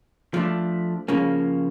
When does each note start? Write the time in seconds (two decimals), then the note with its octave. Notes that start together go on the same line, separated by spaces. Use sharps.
0.34 F3 A3 D4
1.08 C#3 F3 A#3 C#4